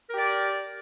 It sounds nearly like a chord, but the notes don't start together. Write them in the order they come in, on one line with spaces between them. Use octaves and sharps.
A#4 G4 D5